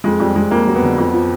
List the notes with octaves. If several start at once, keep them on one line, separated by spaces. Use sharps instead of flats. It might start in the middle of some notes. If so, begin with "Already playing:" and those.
F2 G#3
F2 G3
F2 G#3
F2 A#3
F#3
B3
D3
F2
F3